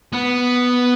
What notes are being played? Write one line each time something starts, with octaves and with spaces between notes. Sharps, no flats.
B3